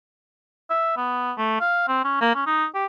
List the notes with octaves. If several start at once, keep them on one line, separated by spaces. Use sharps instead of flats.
E5
B3
A3
F5
C4
C#4
A#3
C#4
D#4
G4